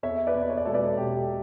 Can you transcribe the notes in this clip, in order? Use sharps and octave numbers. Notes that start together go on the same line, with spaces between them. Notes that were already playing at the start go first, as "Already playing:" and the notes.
E2 C#5 E5
B4 D5
E2
C#5
D5
E1 A4 C#5
B4 D5
B2 G4